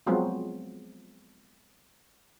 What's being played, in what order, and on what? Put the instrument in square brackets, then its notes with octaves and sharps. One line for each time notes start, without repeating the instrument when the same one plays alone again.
[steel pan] F3 F#3 G#3 B3 C4 F4